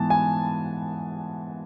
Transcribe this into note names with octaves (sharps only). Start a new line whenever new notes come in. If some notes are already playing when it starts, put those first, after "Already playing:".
Already playing: G#2 E3 B3 A5
G#5